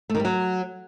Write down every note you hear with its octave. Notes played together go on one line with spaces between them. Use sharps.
A3
D#3
G3
F#3